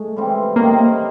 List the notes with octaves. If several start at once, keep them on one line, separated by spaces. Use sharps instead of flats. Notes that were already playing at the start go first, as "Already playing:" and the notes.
Already playing: G#3 A3
C#3 E3 G3 C4
C3 D#3 G3 A#3